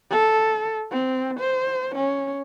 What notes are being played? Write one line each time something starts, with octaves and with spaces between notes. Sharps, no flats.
A4
C4
C5
C#4